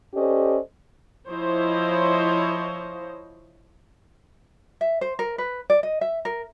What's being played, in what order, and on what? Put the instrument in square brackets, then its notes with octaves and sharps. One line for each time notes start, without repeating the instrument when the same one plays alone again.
[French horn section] C#4 G4 A4 C5 D5 D#5
[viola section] F3 E4 C5 C#5 D#5
[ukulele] E5
C5
A#4
B4
D5
D#5
E5
A#4